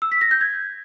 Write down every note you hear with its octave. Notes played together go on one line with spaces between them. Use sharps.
E6
B6
A#6
G6
G#6